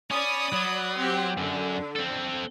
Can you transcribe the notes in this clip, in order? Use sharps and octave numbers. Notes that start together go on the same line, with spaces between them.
C#4 D5 B5 D#6
F#3
C4 G4
F#2 D3 D4
C4 A4